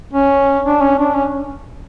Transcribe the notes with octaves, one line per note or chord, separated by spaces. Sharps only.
C#4
D4
C#4
D4
C#4